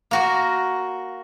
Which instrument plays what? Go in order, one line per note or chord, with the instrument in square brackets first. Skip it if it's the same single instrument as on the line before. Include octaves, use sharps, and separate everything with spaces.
[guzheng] A#3 F#4 A#4